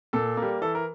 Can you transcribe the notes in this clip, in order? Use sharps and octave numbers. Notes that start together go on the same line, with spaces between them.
A#2 A4
G3 A#3
E3 A4
A#4